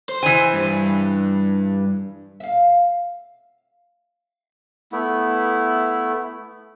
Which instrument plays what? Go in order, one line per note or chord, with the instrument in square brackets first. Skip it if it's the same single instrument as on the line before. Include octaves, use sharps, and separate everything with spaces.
[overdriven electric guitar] C5
[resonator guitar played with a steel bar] E3 G#5
[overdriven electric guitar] G2
[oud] E5 F5
[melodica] A3 B3 E4